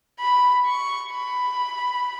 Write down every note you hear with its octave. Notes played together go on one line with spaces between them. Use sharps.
B5
C#6
B5